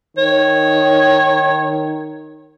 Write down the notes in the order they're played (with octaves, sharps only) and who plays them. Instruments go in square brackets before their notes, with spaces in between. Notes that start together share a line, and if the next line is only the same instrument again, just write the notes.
[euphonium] D#3 [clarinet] C#5